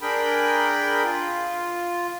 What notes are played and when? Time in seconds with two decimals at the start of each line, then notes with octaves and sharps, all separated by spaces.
0.01 D4 G#4 A#4 G5 B5
1.04 F4